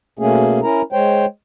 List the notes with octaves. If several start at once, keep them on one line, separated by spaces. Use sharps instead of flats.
B2 A3 A#3 C#4 G#4
C#4 E4 A#4 A#5
G#3 C5 C#5 G5